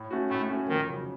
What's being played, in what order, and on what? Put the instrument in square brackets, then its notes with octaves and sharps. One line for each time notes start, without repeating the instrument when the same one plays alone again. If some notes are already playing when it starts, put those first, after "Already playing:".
Already playing: [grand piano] A2
A3 C#4 F#4
[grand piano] A2 [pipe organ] A3
[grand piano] A3 C#4 F#4
[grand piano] F2 [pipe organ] D#3
[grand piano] C#3 F#3